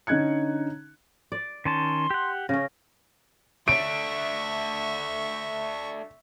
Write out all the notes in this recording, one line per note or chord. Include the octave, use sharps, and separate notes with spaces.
D3 C#4 D#4 F#6 G#6 C#7
D5
D#3 C#4 A5 C6
G4 F#5
C#3 C#4 A#6
A3 D4 E5 C#6 D7